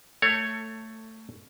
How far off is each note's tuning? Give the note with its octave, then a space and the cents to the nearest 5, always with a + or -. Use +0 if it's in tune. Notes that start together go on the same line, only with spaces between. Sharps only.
A3 +15 A4 +25 C#5 +0